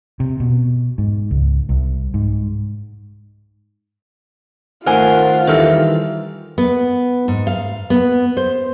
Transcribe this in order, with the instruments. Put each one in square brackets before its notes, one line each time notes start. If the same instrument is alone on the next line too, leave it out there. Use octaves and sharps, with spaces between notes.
[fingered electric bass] C3
B2
G#2
C#2
C2
G#2
[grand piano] D#3 A3 [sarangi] F4 [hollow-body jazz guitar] A#4 G#5 [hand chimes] C5 F#5
[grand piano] D#3 E3 G3 [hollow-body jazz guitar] A4 C5 [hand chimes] E5 F6
[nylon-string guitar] B3
G#2
F5
B3
C5